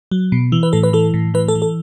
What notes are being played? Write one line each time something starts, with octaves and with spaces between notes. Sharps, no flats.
F#3
B2
E3
B4
A2 A4
B4
E3 A4
A2
E3 B4
A4
E3
A4